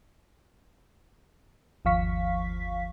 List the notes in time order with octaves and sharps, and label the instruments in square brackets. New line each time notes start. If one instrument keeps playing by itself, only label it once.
[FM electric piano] G1 D#2 F3 F5 C#6 B6